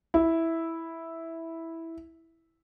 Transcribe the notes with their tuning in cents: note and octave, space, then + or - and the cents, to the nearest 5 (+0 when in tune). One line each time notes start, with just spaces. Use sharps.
E4 -5